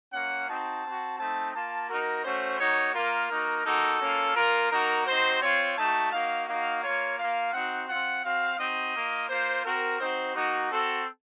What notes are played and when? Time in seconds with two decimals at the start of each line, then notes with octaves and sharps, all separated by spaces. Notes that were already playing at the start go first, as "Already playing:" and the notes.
0.13 A#3 C#4 F4 F#5
0.49 C4 D#4 F#4 A5
0.84 C4 F#4
1.19 A3 C4 D#4 A5
1.54 A#3 F4 A5
1.90 A#3 D#4 F#4 A#4
2.25 A3 C#4 F#4 C5
2.60 A#3 D#4 F#4 C#5
2.95 A#3 F4 A#4
3.31 A#3 D#4 F#4
3.66 A#3 D#4 F#4 A4
4.01 A#3 C#4 F4
4.36 A#3 F4 A#4
4.71 A#3 D#4 F#4 A#4
5.07 C4 D#4 F#4 C5
5.42 C4 F4 C#5
5.77 A3 D#4 F#4 A5
6.12 A#3 D#4 F#4 F5
6.48 A#3 D#4 F#4 F5
6.84 A#3 F4 C#5
7.19 A#3 F4 F5
7.53 C4 D#4 F#4 F#5
7.89 C4 F4 F#5
8.24 C4 F#4 F5
8.59 C4 D#4 F#4 D#5
8.94 A#3 F4
9.29 A#3 F4 C5
9.65 C4 F#4 A#4
10.00 C4 D#4 F#4 C5
10.36 A#3 D#4 F#4
10.70 C4 F#4 A4